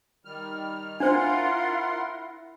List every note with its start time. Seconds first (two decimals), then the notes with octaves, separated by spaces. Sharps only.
0.25 D#3 G3 F6
1.00 D4 E4 F4 A#4 C5 F#5 C6